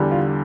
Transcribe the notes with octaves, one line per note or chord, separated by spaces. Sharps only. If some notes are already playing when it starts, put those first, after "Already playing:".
Already playing: E2 D3 G3
F4